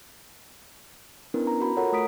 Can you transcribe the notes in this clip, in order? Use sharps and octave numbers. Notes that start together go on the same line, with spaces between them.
B3 C#4 D4 E4 A#4 B4
A#5
F#4 B5
F4 A4 A#4 C#5 F#5 A#5
A3 A#5 D#6 B6 D7